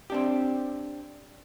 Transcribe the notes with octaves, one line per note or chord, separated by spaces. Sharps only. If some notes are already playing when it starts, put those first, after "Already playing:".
C4 D4 G4